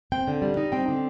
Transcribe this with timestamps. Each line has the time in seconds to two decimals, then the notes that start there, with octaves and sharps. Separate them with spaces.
0.12 C4 G5
0.28 D3
0.42 G3
0.57 D#4
0.72 C4 G5
0.88 D3